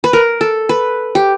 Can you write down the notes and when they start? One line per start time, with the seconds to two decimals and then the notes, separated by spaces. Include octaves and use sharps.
0.04 B4
0.13 A#4
0.41 A4
0.69 B4
1.15 G4